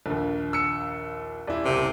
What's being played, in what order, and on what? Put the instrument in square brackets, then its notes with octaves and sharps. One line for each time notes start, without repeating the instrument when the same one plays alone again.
[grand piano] A#1 D#2
[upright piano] E6 C#7
[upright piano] D#1 E4 [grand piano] D5
[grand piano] F#1 C2 [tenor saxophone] C3